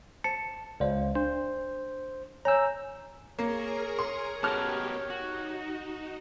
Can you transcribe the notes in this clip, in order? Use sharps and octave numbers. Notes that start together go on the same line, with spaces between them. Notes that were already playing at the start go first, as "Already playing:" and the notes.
C5 A5 C#7
C#2 C5 D5 F5
D4 C5
C#5 G#5 A#5 E6 G6
A#3 G#4 A#4 C#5 A#5
C6
B3 F#4 G4 A#4 A5 F6
D#4 F#4